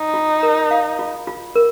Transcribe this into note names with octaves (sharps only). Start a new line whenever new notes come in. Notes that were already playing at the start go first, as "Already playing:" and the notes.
Already playing: D#4
F4
A#4
F5
F4
F4
A#4